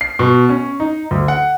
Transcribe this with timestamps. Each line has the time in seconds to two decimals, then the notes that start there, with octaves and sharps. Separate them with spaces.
0.01 C7
0.19 B2
0.49 C#4
0.80 D#4
1.11 D2
1.28 F#5